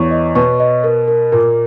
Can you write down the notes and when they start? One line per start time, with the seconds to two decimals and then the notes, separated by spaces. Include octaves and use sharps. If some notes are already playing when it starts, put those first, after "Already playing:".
Already playing: E2 E3 C#5 C#6
0.11 D#5
0.35 B2 B3 C#6
0.60 D#5
0.84 A#4
1.08 A#4
1.32 A#2 A#3 A#4